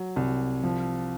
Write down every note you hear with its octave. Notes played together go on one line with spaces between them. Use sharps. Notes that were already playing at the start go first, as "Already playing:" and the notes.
Already playing: F#3
C2
F3